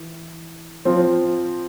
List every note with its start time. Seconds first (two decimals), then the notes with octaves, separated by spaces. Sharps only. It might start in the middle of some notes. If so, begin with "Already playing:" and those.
Already playing: E3
0.85 F3 C4 F4